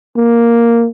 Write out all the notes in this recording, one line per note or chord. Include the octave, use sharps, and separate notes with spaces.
A#3